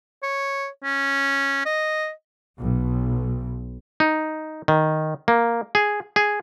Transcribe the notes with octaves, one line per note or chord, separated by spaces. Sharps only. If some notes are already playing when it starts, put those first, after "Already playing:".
C#5
C#4
D#5
B1
D#4
D#3
A#3
G#4
G#4